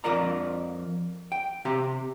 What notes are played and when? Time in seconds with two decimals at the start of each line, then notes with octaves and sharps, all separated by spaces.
0.04 F2 F4 A#4 D5 A#5
1.32 G5
1.65 C3 G4 A#5